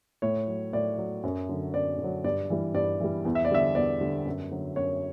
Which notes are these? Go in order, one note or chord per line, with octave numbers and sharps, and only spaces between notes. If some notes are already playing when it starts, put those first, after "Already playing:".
A2 C#5
F#3
A2 D5
F#3
F#2
D3 F#3
F#2 D5
D3
F#3
G2 D5
E3 G3
G2 D5
E3 G3
E2
E5
D5
D3 G3 E5
E2 D5
D3 G3
F#2
D3 F#3
F#2 C#5